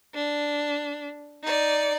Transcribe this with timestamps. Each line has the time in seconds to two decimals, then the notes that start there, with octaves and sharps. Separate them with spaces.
0.14 D4
1.43 D#4 D5